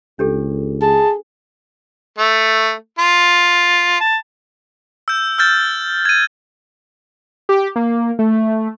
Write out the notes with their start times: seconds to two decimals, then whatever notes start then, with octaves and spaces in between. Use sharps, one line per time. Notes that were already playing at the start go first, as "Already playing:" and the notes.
0.19 C#2 D4 G4 A4
0.82 G#4 A5
2.19 A3
2.99 F4
4.00 A5
5.08 E6 G6
5.38 E6 F6 G6 A6
6.05 G#6 D#7
7.49 G4
7.76 A#3
8.19 A3